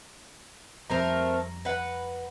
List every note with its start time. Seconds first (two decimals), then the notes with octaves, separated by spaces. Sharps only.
0.90 F2 G3 A3 C4 A#4 A#5
1.65 B4 F#5